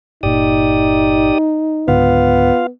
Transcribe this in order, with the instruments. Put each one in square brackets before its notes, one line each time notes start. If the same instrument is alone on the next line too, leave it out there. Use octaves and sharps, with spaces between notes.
[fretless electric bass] G1 A#2 [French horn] D#4 [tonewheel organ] G4 D5 D#6
[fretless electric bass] C#2 G#2 D3 [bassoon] B3 [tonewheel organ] F4 F5